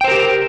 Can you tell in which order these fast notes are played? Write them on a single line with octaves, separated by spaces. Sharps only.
G5 C5 A#4 G4